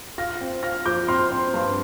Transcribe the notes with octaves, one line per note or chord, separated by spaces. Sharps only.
F4 F6 A#6
C4
F4 F6 A#6
F3 D6 G6
C4 C6 F6
C4
G2